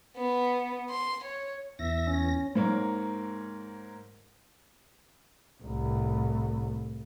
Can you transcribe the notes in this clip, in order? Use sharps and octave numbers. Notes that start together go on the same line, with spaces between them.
B3
C6
C#5
E2 E5 A#6
C#4
G#2 A#3 C#5
C2 A2